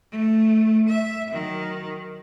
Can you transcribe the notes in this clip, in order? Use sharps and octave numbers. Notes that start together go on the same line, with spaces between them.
A3
E5
D#3 F#3